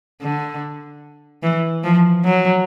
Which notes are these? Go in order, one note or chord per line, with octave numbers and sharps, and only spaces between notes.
D3
E3
F3
F#3